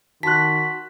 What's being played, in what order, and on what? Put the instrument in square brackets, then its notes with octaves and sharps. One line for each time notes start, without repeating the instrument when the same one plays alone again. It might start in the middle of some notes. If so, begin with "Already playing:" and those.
[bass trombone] D#3 [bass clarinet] F#4 [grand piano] A5 C6 F#6 [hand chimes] B6